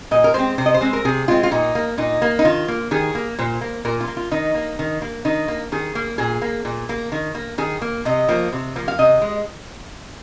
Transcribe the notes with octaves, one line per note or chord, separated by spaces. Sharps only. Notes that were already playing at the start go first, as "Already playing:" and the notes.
A#2 D#5
A#4
G#3 C4 C5
C3 C5
D#5
C5
G#3 C4
A#4
C3 G#4
G#3 C4 F4
F4
A#2 D#4
A#3
A#2 D#4
A#3
D#4
D#3 F4
A#3
D#3 G#4
A#3
A#2 C5
A#3
A#2 A#4
F4
A#3
F4
D#3 D#4
A#3
D#3
A#3
D#3 D#4
A#3
D#3 G#4
A#3
A#2 G#4
A#3
A#2
A#3
D#3
A#3
D#3 G#4
A#3
C3 D#5
F3 A#3
C3
F3 A#3
F5
C3 D#5
G#3